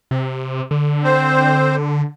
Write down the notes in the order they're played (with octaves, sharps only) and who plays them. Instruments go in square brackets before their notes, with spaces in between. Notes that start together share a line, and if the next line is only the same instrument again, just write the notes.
[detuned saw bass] C3
D3
[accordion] C4 C5